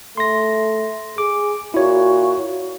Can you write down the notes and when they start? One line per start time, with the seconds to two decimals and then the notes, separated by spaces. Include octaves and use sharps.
0.17 A3 C6 A#6
1.18 G#4 D6
1.74 A#2 E4 F#4 C#5